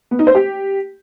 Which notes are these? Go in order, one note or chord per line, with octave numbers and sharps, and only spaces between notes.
B3
D#4
C5
G4